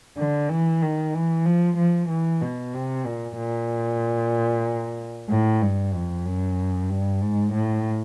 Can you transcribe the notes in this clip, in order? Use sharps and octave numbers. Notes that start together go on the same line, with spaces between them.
D3
E3
D#3
E3
F3
F3
E3
B2
C3
A#2
A#2
A2
G2
F2
F#2
G2
G#2
A2